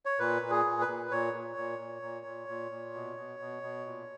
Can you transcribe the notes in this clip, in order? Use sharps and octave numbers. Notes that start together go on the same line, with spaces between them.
C#5
A#2 B4
A#2
G#4
A#2
B4
A#2
A#2 C#5
A#2
A#2
A#2
A#2
A#2
A#2
A#2
B2
B2
B2
B2
A#2